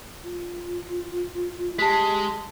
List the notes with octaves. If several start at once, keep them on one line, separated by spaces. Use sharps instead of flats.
F4
G#3 G4 A5 B6